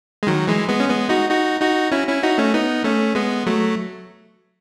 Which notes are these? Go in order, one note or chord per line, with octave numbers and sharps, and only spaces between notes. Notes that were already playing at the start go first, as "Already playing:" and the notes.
G#3
D#3 F#3
E3 G#3
G#3 B3
C#4
G#3 B3
D#4 F#4
D#4 F#4
D#4 F#4
C#4 E4
C#4 E4
D#4 F#4
A3 C#4
B3 D#4
A3 C#4
G#3 B3
F#3 A3